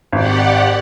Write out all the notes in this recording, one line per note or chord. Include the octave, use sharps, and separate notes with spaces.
G#1 G4 D5 F#5